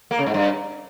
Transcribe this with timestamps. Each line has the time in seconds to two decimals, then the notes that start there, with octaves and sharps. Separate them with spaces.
0.11 A#3
0.19 C#3
0.26 G#2
0.34 G2